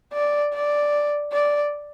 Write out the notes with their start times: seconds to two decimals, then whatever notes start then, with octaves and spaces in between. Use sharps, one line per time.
0.13 D5
0.53 D5
1.32 D5